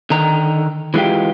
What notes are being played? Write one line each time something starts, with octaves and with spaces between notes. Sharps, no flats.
D3 D#3 A#5
E3 G#3 C#4 F4 G4